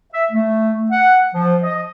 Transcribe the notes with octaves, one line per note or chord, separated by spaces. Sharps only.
E5
A3
F#5
F3
D#5